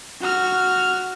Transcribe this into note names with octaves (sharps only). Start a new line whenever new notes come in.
F#4 F6